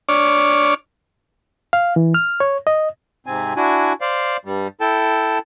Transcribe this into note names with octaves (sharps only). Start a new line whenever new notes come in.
D4 C#5 D5 C#6 D6 F6
F5
E3
F6
C#5
D#5
G#2 C3 C4 G#5
D4 E4 F#4 G#5
C5 D5 F5
G2 G3
E4 A4 G5 A5